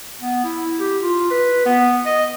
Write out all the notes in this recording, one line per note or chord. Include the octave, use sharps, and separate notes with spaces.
B3
E4
G4
F4
B4
B3
D#5